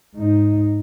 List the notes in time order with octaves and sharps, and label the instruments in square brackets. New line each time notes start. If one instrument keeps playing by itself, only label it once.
[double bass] G#2 D#4